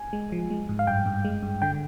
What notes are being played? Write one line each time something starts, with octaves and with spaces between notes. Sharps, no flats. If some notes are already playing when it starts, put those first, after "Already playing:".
Already playing: G#5
G#3
F3
G#3
G#2
F5
G2 G5
G2
G#3
G2
D3 G5